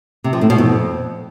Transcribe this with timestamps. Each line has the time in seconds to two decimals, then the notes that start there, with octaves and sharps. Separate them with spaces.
0.24 C3
0.33 F3
0.41 A2
0.50 B2
0.58 F2